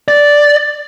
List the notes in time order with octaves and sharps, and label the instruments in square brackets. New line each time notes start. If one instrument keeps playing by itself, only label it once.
[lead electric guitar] D5